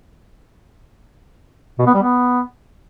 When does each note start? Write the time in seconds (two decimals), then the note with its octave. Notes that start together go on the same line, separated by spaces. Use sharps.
1.79 B2
1.87 B3
1.94 G3
2.02 B3